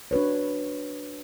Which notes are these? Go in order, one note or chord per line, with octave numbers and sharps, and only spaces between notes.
D4 F#4 B4 C#5